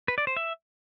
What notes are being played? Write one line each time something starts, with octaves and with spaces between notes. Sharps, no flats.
B4
D5
C5
E5